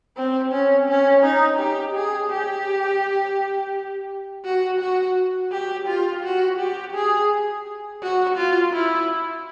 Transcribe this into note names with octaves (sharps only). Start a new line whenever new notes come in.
C4
C#4
C#4
D#4
G4
G#4
G4
F#4
F#4
G4
F4
F#4
G4
G#4
F#4
F4
E4